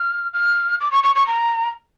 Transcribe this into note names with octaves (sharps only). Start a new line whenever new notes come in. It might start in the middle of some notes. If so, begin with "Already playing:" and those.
Already playing: F6
F6
D6
C#6
C#6
C#6
A#5